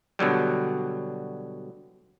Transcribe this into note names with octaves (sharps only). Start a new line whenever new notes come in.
B2 D3 F#3 G3